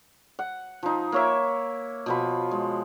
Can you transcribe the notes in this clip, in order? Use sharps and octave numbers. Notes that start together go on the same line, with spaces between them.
F#5
F3 D#4
A#3 C#5 E5
B2 F3 B5
G#3